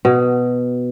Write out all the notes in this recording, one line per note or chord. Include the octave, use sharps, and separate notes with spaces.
B2